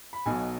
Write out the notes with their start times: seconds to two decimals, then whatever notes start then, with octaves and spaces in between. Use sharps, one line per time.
0.13 B5
0.26 B1 B2 F#3 G#5